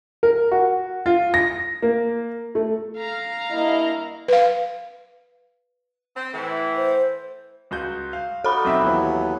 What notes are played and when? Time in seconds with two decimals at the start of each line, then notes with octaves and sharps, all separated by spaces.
0.23 A#4
0.52 F#4
1.06 F4
1.34 A#6
1.82 A#3
2.55 A3
2.98 F5 A#5
3.50 G2 A#3 E4 D#5
4.28 B4 F5
6.16 C4
6.32 A2 E3
6.77 C5
7.71 C#2 F#4 G6
8.13 F5
8.44 D#4 F#4 A4 D5 B5
8.65 B1 C4 E5
8.83 D#2 E3 F#3 B3 E4